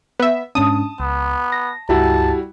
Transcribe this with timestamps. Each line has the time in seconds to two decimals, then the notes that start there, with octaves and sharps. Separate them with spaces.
0.19 B3 E5
0.55 G#2 C#4 D4 A5 D#6
1.00 C#2 B3
1.52 A#6
1.89 C#2 G2 G3 E4 F#4 A5